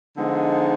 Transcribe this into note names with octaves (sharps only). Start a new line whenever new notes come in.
D3 F3 G#3 B3 D#4